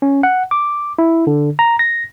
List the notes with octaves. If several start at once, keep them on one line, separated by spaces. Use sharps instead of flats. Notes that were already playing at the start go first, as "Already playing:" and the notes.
C#4
F#5
D6
E4
D3
A#5
A#6